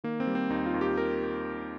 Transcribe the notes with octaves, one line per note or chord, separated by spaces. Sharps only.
D#3 A#3
C4
G3
C4
D#2 D#4
F4
D#2
G4
A#4